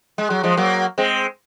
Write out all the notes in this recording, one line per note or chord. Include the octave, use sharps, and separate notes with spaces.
G#3
F#3
F3 G#3
F#3 A#3
G#3 C4